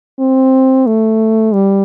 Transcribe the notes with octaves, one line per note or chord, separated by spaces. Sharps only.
C4
A3
G3